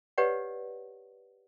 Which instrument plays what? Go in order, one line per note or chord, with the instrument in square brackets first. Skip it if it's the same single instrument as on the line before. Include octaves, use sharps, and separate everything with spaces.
[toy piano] G4 B4 C#5 D5 F#5